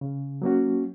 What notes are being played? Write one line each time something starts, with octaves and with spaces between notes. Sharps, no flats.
C#3
F#3 A#3 C#4 F#4